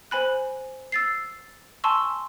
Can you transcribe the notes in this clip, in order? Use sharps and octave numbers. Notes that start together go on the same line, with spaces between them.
C5 G#5 B5 F#6
E6 A6 C7
G#5 A5 C6 C#6 E6